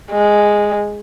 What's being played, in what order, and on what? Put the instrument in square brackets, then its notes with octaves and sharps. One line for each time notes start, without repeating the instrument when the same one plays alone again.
[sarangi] G#3